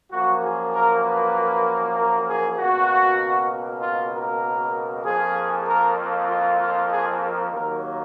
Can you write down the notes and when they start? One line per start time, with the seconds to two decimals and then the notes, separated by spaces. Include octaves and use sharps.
0.10 F#2 F3 A#3 F#4
0.42 G#4
0.72 A#4
1.04 B4
1.96 A#4
2.27 G#4
2.57 C#2 B2 A#3 F#4
3.81 F4
4.12 A#4
5.04 F2 F3 A#3 G#4
5.66 A#4
6.28 F4
6.59 F4
6.89 G#4
7.21 A#4
7.52 D#2 D#3 F#3 A#3 A#4